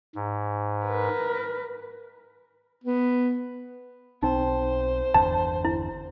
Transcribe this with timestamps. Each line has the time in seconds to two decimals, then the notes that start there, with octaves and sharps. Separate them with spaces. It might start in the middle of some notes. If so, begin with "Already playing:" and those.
0.15 G#2
0.85 A#4 B4
2.84 B3
4.23 B1 C4 D#4 C5
5.14 G1 E2 D3 A5
5.65 E4